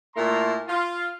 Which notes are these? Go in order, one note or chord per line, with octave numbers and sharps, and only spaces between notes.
A#2 A3 E4 A#4 A#5 C6
F4